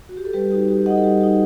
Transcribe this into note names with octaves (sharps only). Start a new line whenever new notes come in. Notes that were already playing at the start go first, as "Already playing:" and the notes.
F#4
G4
A4
G3 G4 B4
D#4 F#4 G4
G3 G4
D#4 F#4 D#5 F#5
A4
G3 G4
D#4 F#4